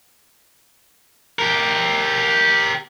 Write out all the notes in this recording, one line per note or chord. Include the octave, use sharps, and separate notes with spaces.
G4 A#4